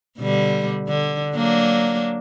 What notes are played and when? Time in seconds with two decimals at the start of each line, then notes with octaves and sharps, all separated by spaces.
0.19 B2 D3 G3
0.89 D3
1.35 F#3 A#3 D4